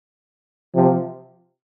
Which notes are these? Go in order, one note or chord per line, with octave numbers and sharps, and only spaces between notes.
C3 F3